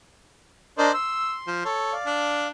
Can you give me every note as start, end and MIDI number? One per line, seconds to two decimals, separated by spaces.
0.78 0.92 62
0.78 0.92 70
0.78 0.92 72
0.78 0.92 74
0.78 0.92 75
0.94 1.68 84
0.94 1.35 88
1.47 1.63 53
1.65 1.94 69
1.65 1.94 73
1.92 2.47 74
1.92 2.47 77
2.06 2.51 62